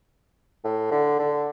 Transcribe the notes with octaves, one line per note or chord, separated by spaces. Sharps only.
A2
D3
D3